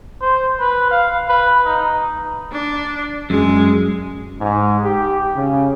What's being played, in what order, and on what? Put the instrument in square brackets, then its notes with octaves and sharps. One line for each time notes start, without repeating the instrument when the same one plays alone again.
[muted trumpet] C5
B4
F5
B4
D#4
[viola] D4
[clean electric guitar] F#2 [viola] G#3
[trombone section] G#2
G4
C#3